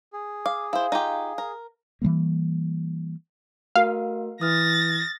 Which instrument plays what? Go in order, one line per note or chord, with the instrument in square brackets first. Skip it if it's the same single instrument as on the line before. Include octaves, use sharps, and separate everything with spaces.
[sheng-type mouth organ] G#4
[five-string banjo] F5 [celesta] D6
[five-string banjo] E4 C5 [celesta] F5
[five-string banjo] D#4 F4 G4
A#4
[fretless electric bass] E3 F3 G3 A#3
[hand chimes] A3 F#4 A#4 [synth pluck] F5
[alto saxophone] E3 [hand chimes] D#6 F6 [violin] A6 A#6